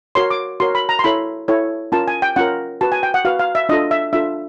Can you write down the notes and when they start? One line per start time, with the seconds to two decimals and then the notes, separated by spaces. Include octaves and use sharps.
0.15 F#4 A#4 C#5 C6
0.31 D6
0.60 F#4 A#4 C#5 C6
0.75 B5
0.89 A#5
0.99 C6
1.04 E4 A4 C#5 B5
1.48 E4 A4 C#5
1.92 C#4 F4 A#4 A5
2.08 G#5
2.22 G5
2.36 C#4 F4 A#4 F#5
2.81 F#4 B4 A5
2.92 G#5
3.03 G5
3.14 F#5
3.25 F#4 B4 F5
3.39 F5
3.55 E5
3.69 D4 F4 A4 D#5
3.91 E5
4.13 D4 F4 A4 E5